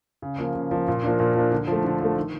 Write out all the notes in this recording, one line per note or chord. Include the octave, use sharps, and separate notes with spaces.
C#3
F3 A#3
C#3
F3 A#3
A#2
F3 A#3 D4
A#2
F3 A#3 D4
D3
F3 A3
D3
F3 A3
D#3